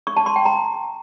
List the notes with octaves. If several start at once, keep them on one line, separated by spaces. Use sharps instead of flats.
C#6
A5
C6
G5
A#5